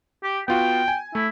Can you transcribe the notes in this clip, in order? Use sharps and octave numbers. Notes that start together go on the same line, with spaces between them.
G4
B3 F4 F#4 G5
G#5
A3 E4